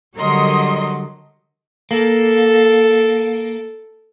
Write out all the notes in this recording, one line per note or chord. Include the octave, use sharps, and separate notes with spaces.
D3 F#3 G3 A#4 D#5 C6
A#3 A4